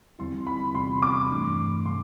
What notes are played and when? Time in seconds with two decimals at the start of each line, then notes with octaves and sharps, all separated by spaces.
0.19 E2 D3 G3 C4 E4 C6
0.47 B5
0.74 E2 C3 G3 C4 F4 C6
1.02 D6
1.30 G2 E3 A3 D4
1.86 C3 G3 C6